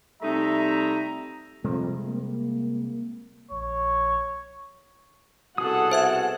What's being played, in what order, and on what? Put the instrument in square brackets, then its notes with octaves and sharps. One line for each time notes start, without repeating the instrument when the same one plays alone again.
[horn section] C3 G3 A3 D#4 E5 A#5
[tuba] F2 [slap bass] C3 G3 G#3
[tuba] A#3
[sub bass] A#1 [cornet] C#5
[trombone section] C2 B2 F#4 [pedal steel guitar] G#4 D#6 [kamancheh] A4 F#5
[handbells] C5 E5 G#6